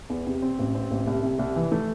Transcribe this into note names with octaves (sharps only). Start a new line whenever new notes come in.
E2
C3
C4
A1
C4
A1
C2
C3
C2
E3
A3